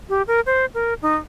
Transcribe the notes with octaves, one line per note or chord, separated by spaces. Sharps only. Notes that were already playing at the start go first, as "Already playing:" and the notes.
G4
A#4
C5
A#4
D#4